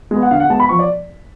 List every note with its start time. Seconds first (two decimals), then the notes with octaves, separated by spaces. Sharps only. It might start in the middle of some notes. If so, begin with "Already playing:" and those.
0.11 G#3 B3
0.23 F#5
0.31 D3 F5
0.40 F#5
0.50 G#3 B3 A5
0.60 B5
0.69 F3 C#6
0.79 D5